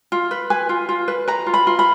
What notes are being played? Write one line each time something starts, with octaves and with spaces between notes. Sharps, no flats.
F4
B4
B4 G#5
F4
F4
B4
B4 A#5
F4
B5
F4
B5